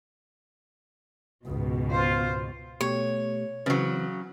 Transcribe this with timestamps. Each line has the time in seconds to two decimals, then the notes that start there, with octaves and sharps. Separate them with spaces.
1.45 C#2 G#2 B2
1.91 F4 C5
2.81 B2 A3 G4 C#5
3.66 C#3 E3 F#3 C4 B4